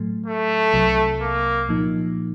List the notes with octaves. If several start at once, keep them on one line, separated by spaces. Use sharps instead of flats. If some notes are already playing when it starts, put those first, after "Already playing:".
Already playing: A2 F#3 A3
A3
C2 C3 F#3
A#3
A#2 F3 A#3 D#4